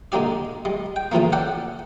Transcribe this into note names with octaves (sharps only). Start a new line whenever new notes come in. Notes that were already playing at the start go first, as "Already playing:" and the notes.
D3 G#3 A#3 G4 D5
G3 G#3
G5
C#3 E3 F3 A3 A#3
A4 D5 F#5 G5